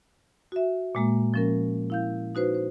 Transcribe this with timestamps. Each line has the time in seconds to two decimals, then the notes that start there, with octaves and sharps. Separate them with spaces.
0.52 F#4 E5
0.95 A#2 G#3 A#3
1.34 F3 C#4 A#4
1.90 E4 F5 G6
2.35 D#4 F#4 B4 C5
2.54 C5